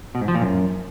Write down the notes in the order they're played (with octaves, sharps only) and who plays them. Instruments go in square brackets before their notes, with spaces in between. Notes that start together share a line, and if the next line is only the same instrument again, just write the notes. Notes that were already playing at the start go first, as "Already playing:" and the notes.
[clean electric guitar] B2
G#2
F3
A#2
F#2